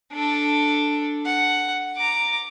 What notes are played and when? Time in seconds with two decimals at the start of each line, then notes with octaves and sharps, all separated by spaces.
0.13 D4 A4
1.25 F#5
1.97 A#5 D6